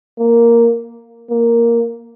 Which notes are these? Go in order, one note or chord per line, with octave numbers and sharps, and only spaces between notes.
A#3
A#3